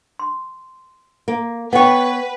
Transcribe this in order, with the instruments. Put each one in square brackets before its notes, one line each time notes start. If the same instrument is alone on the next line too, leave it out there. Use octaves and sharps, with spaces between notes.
[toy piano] C6
[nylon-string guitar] A#3
[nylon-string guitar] B3 C#5 [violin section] B4 [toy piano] F#5 G5